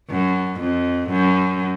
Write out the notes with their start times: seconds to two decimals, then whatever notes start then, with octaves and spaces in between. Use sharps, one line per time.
0.10 F#2
0.60 F2
1.10 F#2